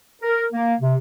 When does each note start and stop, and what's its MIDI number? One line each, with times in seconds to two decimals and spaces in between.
0.22 0.45 70
0.52 0.75 58
0.81 0.96 48